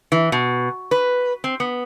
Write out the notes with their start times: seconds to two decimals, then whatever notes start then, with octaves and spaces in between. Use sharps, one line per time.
0.12 E3
0.32 B2
0.91 B4
1.44 C4
1.60 B3